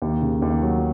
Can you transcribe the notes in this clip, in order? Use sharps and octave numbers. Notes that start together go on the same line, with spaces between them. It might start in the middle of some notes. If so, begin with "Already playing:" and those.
D#2
C#3
D#2
F#3